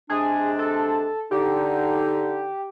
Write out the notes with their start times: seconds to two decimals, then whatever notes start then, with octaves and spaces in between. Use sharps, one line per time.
0.09 C3 G#3 D4 G#4
0.59 A4
1.31 D3 D#4 G4